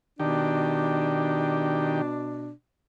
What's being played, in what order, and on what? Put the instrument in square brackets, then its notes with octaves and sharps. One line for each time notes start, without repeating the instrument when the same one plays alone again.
[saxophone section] B2 D4 [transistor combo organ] D#3 G4